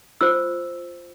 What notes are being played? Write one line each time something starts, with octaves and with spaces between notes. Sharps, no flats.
F4 C5 E6